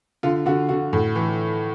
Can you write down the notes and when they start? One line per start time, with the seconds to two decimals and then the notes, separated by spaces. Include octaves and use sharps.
0.23 D3 F4
0.46 D3 F#4
0.69 D3 F#4
0.93 A2
1.15 E3